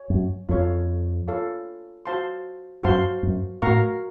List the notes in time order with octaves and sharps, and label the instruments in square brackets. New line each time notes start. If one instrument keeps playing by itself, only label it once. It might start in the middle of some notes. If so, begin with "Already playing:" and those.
Already playing: [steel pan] C#5
[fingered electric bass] F#2
[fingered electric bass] F2 [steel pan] F4 A4 C#5 F5
[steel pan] F4 A4 C#5 F5
F#4 C5 F5 A5 C6
[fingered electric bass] F#2 [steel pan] F#4 C5 F5 A5 C6
[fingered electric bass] F#2
[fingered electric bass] A2 [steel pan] F#4 A#4 F5 A#5 C#6